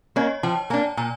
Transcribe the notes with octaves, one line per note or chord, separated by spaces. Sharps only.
A#3 C#4 C#5 D#5
F3 G5 A5
A#3 D4 G#5 A#5
A#2 G#5 A#5